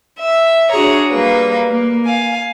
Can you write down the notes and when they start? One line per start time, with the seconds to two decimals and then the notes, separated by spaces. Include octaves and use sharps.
0.19 E5
0.70 D4 F#4 G#4 C#5 A#5
1.10 G3 A#3 B4
1.70 A#3
2.05 F5 G#5